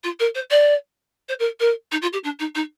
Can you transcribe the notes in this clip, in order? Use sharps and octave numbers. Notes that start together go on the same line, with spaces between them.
F4
A#4
C5
D5
C5
A#4
A#4
D#4
F4
G4
D4
D#4
D#4